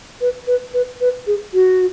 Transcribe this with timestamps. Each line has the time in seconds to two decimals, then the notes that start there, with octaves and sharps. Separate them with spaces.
0.21 B4
0.47 B4
0.74 B4
1.01 B4
1.27 G#4
1.54 F#4